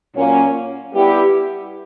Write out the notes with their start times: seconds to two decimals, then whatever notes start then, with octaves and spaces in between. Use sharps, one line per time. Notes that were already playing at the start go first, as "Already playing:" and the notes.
0.15 A#2 F#3 A#3 C#4
0.93 G3 B3 E4 G4